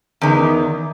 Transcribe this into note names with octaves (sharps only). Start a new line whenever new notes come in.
E2 D#3